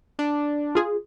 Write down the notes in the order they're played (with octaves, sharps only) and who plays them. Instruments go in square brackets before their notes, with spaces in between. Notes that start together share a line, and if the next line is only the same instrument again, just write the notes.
[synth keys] D4
[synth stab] F4 G#4